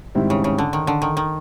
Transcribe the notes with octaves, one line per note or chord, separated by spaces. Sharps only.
G#2 D#3 G3 C4 E4
C#3
C#3
D3
D#3
D3
D#3
D#3